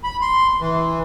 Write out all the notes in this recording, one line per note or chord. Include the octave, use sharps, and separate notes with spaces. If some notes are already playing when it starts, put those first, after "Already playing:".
B5
C6
E3